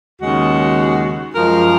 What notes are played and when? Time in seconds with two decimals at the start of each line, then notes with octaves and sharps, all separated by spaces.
0.20 D#2 C#3 G#3 F#4
1.35 F#2 F3 G#3 A#4